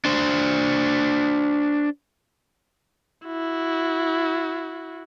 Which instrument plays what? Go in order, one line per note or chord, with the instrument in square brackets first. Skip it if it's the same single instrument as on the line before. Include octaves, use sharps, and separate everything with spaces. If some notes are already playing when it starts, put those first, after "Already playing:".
[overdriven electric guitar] D4 C5
[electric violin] E4 F#4